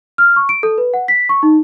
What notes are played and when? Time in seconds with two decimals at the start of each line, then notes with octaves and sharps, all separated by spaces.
0.18 F6
0.36 C#6
0.49 D7
0.63 A4
0.78 B4
0.94 F#5
1.08 B6
1.29 C#6
1.43 D#4